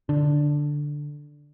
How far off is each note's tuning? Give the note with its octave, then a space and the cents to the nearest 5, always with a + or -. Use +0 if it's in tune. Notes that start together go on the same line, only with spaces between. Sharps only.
D3 +0 D4 +0